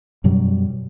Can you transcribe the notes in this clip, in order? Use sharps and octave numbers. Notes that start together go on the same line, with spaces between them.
F#2 B2 F#3 G3